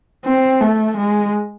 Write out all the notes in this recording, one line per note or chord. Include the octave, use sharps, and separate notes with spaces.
C4
A3
G#3